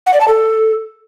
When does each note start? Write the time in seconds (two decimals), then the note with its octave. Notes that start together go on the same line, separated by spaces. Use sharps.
0.06 F#5
0.14 D5
0.21 A5
0.28 A4